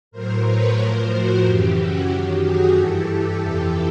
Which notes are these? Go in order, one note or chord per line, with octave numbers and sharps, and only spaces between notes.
A2 F#3 A#4 C5
B4 C#5
A2 F3 A#4 C5
F#4
F#2 C#3 E3 G4
F#4
F#2 D#3 F#3 G4
F#4 G#4
G2 E3 G4 A4
G4 A4
F2 C3 E3